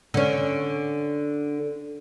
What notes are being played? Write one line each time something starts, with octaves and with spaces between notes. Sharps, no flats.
D3 C#4